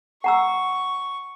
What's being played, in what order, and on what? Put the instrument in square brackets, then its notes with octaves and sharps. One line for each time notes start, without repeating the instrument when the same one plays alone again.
[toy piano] F#5 A#5 E6 [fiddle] C#6